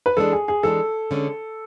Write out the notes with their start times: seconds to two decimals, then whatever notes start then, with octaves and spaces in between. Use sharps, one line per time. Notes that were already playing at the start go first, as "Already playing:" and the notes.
0.06 B4
0.17 E3 G#3 D4 A4
0.33 G#4
0.48 G#4
0.63 E3 G#3 D4 A4
1.11 D3 G#3 C#4